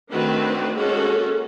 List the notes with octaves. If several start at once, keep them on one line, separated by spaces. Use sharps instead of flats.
D#3 A3 C4 D4 F#4 B4
G#3 A#3 C#4 F#4 A4